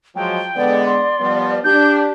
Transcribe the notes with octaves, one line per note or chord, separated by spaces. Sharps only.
F3 F#3 G#3 G5
D3 G#3 B3 D5
C6
F3 G3 B3
D4 G4 G6